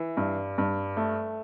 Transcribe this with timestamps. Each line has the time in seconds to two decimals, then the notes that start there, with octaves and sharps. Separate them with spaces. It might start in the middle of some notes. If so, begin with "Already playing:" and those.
Already playing: E3
0.17 G2
0.58 G2
0.97 A3